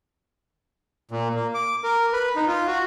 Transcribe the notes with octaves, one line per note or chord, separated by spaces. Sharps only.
A#2
A#3
D6
A#4
B4
D#4
F4
F#4